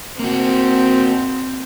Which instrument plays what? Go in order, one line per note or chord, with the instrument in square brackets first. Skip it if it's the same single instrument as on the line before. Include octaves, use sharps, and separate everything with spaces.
[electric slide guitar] A#3 F#4 [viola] C4